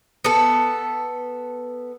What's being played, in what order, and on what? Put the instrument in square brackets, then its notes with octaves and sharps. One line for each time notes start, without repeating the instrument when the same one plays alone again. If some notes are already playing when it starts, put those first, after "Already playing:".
[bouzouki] B3 A4